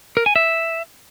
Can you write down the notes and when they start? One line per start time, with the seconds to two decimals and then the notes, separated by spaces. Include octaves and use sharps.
0.17 A#4
0.26 G#5
0.36 E5